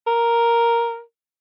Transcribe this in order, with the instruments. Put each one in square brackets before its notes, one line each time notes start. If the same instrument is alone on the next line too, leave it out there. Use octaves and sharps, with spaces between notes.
[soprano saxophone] A#4